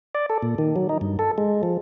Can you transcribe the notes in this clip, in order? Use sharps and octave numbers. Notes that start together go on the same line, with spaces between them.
D5
A4
A#2
D#3
F#3
D#4
G2
A4
G#3
F3